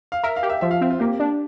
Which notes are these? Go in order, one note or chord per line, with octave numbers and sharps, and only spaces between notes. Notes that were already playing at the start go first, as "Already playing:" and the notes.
F5
A#4 E5
F5
G4
E5
F3 E5
F5
C4 E5
F4
A#3 G4
D4